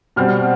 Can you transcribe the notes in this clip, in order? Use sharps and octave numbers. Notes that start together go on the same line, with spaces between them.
B2 G3 C4 F6